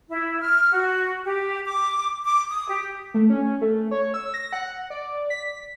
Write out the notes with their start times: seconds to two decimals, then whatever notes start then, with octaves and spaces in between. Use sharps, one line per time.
0.10 E4
0.41 F6
0.72 F#4
1.24 G4
1.66 D6
2.25 D6
2.51 D#6
2.68 G4
3.14 A3
3.30 C#4
3.61 A3
3.91 C#5
4.14 E6
4.34 A#6
4.53 F#5
4.90 D5
5.30 B6